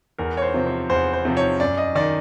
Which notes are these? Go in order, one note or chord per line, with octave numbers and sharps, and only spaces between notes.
E2 A#4
C#5
C5
C3 F3
C5
E2 C5
C5
C3 F3
C#5
F#2 D5
D#5
D#3 D5